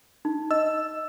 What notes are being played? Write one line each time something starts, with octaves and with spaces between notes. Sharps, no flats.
D#4
D#5 E6